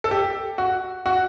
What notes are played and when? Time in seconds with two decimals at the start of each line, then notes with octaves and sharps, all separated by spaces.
0.04 A4
0.11 G4
0.58 F#4
1.06 F#4